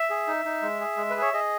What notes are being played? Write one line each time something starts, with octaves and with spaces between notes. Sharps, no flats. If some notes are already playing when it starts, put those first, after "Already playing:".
Already playing: E5
G#4
D#4
D#4
G#3
G#4
G#3
G#4 B4
C#5
G#4 D#5